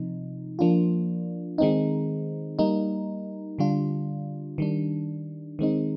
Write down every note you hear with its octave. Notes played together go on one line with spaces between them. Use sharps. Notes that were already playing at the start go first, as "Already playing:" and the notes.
Already playing: C3 F3 D#4
F3 A#3 D4 F4
D#3 G#3 C4 D#4
G3 A#3 D#4
D3 G3 D4 F4
D#3 G3 D4
D#3 G#3 C4 D#4